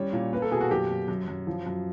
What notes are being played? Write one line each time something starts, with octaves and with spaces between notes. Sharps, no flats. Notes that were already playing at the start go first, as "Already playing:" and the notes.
Already playing: G3 C#4 C#5
A#2
A#3 B4
A4
B2 G#4
F#4
F#2 G4
F#2
F#2
F#2
F3
F#2